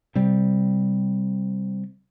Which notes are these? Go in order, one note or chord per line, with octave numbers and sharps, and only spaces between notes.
C3 G3